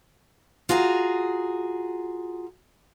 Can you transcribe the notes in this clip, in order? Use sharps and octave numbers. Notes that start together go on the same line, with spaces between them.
F4 F#4 G#4 A#5